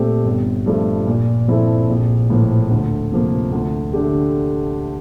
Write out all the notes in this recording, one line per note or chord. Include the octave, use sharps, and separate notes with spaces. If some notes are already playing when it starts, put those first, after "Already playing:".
Already playing: A#2 A3 C4 G4
G1
G2 F3 A3
A#2
F3 C4 E4 A4
A#1
A2 F3 A#3
D2
C3 F3 A#3
D2
D3 A3 D4 G4